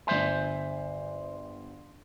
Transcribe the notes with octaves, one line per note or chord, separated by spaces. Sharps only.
G1 C5 E5 G#5 C6